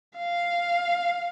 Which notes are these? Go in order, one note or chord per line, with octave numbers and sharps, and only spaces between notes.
F5